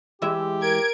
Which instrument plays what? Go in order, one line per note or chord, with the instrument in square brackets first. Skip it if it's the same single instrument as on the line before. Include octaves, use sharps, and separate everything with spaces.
[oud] E3 G#3 E5 [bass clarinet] G4
[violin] A#4 [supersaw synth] G#6 D7